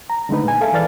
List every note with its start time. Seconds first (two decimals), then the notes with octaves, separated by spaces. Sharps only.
0.10 A#5
0.29 D3 G#3 A3 D#4 B4
0.44 A#2 G#5
0.61 G#4 A4 E5 F5
0.73 E3 A4 B4 D5 F6 A6